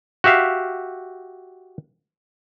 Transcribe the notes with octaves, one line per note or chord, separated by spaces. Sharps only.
F#4 G4 E5 F5